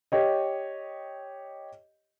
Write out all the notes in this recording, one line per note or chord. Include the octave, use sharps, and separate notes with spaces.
G4 C#5 D#5